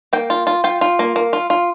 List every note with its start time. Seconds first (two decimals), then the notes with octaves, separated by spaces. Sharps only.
0.13 A#3 G5
0.30 F4
0.47 F4
0.64 F4 G5
0.81 F4
0.99 A#3
1.16 A#3
1.33 F4
1.50 F4